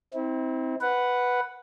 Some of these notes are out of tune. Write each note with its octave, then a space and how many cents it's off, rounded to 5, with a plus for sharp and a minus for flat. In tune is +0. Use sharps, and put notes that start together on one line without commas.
C4 +0 E4 -40
B4 +0 F#5 +0